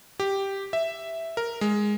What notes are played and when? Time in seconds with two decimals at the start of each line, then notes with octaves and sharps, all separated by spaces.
0.20 G4
0.73 E5
1.37 A#4
1.61 G#3